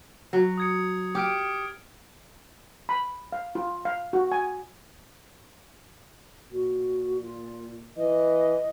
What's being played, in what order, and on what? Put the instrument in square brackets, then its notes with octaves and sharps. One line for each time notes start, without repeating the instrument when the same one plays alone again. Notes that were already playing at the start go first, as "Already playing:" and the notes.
[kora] F#3
[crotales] D#6 G#6 C#7
[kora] G4 [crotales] D6 F6 D7
[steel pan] B5
F5
F4
F5
F#4
G#5
[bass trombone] A#2 [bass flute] F#4
[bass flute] F4
[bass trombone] E3 [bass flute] D#5